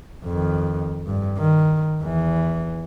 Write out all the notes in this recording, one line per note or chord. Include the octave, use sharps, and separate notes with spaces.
F2 D#3
G2
D#3
E2 E3